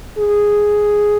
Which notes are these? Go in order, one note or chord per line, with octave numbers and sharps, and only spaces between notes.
G#4